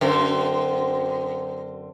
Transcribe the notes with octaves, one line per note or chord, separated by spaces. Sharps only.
F#2 D3 C4